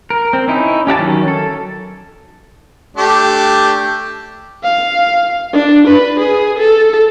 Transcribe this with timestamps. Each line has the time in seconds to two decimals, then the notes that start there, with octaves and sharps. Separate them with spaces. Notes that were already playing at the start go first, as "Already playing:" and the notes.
0.10 A#4
0.33 C4
0.48 C#4 D#4 E4
0.87 C#4 G4 F#5 A5
0.99 D#3 F#3 C#4
1.28 A4
2.97 A3 D4 G4
4.63 F5
5.53 D4
5.88 B4
6.20 G#4
6.59 A4